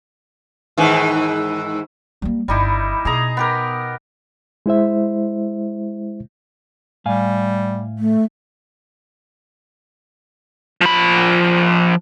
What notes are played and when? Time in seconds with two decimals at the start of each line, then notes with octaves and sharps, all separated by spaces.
0.78 G#2 D#3 E3
2.22 G3 A#3
2.48 G1 G3 D#4 E4
3.05 B2 G#4 D#5 A#5
3.37 B3 G4 A#4
4.66 G#3 E4 C5 E5
7.06 A2 G3 F5 G#5
7.99 A3
10.81 F3 B5